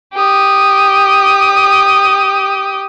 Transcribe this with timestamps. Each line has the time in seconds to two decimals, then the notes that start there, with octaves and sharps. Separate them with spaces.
0.16 G4 D#6